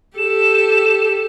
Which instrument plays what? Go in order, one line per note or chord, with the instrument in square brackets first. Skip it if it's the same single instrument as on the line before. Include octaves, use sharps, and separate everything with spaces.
[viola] G4 A4 [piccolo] E7